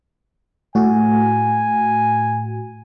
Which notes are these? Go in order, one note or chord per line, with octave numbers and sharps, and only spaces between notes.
A2 F#4 G#5